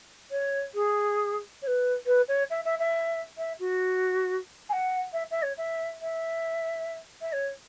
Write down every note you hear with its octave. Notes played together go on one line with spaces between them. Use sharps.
C#5
G#4
C#5
B4
B4
C#5
E5
E5
E5
E5
F#4
G#5
F#5
E5
E5
C#5
E5
E5
E5
C#5